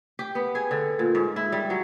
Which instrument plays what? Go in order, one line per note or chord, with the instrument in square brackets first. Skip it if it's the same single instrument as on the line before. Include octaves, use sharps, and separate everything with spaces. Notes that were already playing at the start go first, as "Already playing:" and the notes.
[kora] G4
B3
G#4
D3
A#2
G#2
E4
G3
F#3